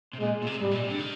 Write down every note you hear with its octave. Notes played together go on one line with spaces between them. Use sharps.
C3
A#2 G#3
A#2
C3
G#2 G3
A#2
C3
D3
D#3